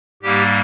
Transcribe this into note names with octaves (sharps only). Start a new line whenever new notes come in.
G#2 G3 A#3 G4